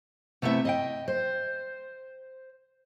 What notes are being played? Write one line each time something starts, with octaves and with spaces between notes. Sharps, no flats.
C3 A3 B3 E4 E5
D#5 F5 G5
C5